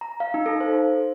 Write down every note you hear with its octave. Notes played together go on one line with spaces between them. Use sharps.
A#5
F5
D#4
A4
C5